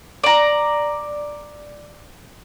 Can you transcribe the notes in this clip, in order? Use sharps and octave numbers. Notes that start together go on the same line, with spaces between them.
D5 A#5